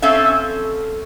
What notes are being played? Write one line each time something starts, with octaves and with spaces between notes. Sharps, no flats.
C4 C#4 A4 E5 F5